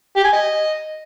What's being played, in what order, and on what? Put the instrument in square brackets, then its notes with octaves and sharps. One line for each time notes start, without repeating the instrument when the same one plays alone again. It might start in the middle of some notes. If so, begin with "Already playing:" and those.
[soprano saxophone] G4
G#5
D#5